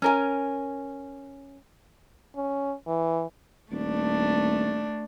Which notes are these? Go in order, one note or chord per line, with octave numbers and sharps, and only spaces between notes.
C#4 A#4 G#5
C#4
E3
D#1 A3 D4